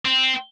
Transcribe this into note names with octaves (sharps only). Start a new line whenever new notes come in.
C4